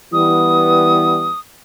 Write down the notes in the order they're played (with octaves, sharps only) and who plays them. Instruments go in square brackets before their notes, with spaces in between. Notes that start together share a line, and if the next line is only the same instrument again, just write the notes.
[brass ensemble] E3 G3 B3 [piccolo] D#6